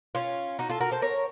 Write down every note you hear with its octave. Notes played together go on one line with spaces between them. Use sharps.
C#4 F4
D#4 F#4
F4 A4
F#4 A#4
A4 C5
A#4 C#5